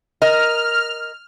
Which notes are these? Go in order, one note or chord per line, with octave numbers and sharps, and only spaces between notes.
A#4 D#5 F6